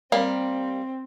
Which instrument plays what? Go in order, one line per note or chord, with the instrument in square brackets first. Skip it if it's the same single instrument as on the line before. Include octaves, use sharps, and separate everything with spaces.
[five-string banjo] G3 A#3 [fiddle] C4